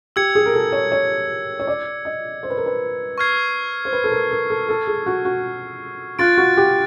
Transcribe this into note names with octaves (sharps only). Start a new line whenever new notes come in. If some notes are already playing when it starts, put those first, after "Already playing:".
G4 E6 G#6 C#7
G#4
A#4
A4
C#5
C#5
C#5
D5
D#5
C5
B4
A#4
B4
C#6 F6 G#6 C7
C5
B4
A4
A#4
A#4
A4
A4
G#4
F#4
F#4
F4 F#6 A6 D7
F#4
G4